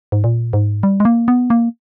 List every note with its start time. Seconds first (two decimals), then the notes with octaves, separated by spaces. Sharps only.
0.12 G#2
0.24 A#2
0.53 G#2
0.83 G3
1.00 G#3
1.05 A#3
1.28 B3
1.50 A#3